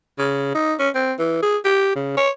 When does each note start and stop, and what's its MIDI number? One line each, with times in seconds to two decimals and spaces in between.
0.18 0.51 49
0.55 0.74 63
0.79 0.90 61
0.95 1.13 60
1.19 1.41 52
1.43 1.58 68
1.65 1.92 67
1.95 2.14 49
2.17 2.30 73